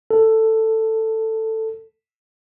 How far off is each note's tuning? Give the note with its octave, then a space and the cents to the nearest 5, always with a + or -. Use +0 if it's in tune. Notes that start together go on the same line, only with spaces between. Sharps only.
A4 +10